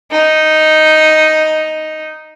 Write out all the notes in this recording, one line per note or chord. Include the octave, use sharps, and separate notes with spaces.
D#4